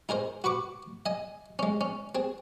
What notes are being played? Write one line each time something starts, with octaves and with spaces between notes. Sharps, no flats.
D#4 G#4 A#4 C5
F#4 B4 C#6 D6
D#5 G#5
G#3 C#4
C#4
C4 G#4